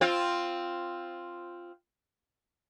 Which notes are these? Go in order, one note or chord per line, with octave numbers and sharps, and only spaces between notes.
C4 F4